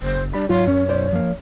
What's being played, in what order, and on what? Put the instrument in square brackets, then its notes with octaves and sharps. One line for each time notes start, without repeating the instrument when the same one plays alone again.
[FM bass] F#1 [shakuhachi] C5
[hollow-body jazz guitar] G3 B5 [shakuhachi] D4
[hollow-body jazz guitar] G#2 F#3 [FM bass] F4 [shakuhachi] C#5
[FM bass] F#2 [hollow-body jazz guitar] C#4
[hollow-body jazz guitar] B1 C5 D5
F3 A#3